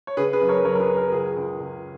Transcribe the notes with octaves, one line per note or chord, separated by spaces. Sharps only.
C#5
C#3 G#4 B4
G#4 B4
F#2
A#4 C#5
F#2 A#4 C#5
A#4
G#4 B4
F#2
A#4
C#2 G#4
C#2
C#2